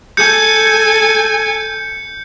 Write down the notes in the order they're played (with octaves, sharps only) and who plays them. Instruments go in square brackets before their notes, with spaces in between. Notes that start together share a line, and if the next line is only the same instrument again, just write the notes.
[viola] A4 G#5 [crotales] G6 C#7